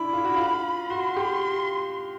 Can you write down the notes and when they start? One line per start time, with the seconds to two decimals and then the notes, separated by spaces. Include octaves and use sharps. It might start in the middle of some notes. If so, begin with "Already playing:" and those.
Already playing: D4 E4 B5
0.13 F4
0.25 F#4
0.36 F4
0.90 F#4 C6
1.16 G4